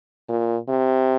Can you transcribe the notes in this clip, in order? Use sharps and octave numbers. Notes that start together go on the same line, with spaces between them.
A#2
C3